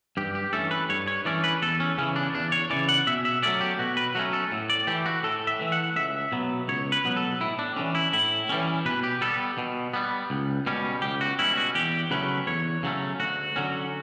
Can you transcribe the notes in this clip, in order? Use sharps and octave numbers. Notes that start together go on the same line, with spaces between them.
G2 G4
G4
E3 A3 C#4 A4
B4
G2 C#5
C#5
E3 A3 C#4 D5
B4
E2 A4
C#4
C#3 E3 C#4
D4
E2 D4
C#5
C#3 E3 D5
F#5
B2 E5
E5
F#3 A3 C#4 D5
G4
B2 F#4
B4
F#3 A3 C#4 F#4
A4
A2
D5
E3 A3 G4
F#4
A2 A4
E5
E3 A3
F#5
C#2 E5
B2 F#3 B3
C#2 C#5
B4
B2 F#3 B3
A4
A2 E4
D4
E3 G3 C#4 D4
E4
A2 E4
E3 G3 C#4
B2 B4
G4
G3 B3 A4
B2
G3 B3
C#2
B2 G3 C#4
C#2 G4
F#4
B2 G3 C#4 E4
F#4
E2 G4
C#3 F#3 A3 C#4 B4
E2 C#5
C#3 F#3 A3 C#4
D2 F#4
D3 F#3 C#4